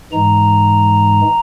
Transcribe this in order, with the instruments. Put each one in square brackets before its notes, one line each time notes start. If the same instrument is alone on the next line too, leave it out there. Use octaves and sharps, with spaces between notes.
[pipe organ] G#2 E3 G#3 A#5